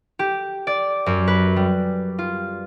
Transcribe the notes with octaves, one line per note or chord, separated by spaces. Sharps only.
G4
D5
F#2
B4
G3
F4